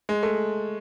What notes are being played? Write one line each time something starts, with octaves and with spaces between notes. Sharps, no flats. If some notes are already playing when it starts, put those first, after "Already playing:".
G#3
A3